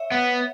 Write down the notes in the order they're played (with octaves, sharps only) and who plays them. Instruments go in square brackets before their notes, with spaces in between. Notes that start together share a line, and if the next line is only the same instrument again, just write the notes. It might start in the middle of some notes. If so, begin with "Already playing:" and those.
Already playing: [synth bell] C#5 E5
[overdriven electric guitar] B3 [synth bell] F#5